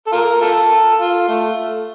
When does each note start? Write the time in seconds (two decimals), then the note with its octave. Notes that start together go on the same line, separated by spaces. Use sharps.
0.07 A4
0.12 F4 A#4
0.41 F4 A4
1.00 F4
1.28 A3